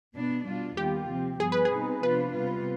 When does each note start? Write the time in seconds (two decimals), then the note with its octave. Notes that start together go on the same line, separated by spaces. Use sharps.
0.14 B2 B3 D4
0.46 B2 G3 D4 F4
0.77 D#2 D#3 G3 B3 F4 G4
1.09 C3 F3 C4
1.40 G2 F3 B3 G#4
1.52 B4
1.65 G#4
1.71 B2 G3 C4 D#4
2.02 C3 F3 B3 D4 F4 B4
2.33 C3 G3 B3 F4